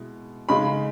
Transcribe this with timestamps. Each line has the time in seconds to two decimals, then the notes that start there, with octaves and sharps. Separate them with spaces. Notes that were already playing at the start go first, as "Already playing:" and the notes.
Already playing: B2 G#3 E4
0.49 C#3 G#3 D#4 B5